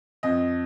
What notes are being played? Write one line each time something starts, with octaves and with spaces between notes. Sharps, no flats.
F2 D#5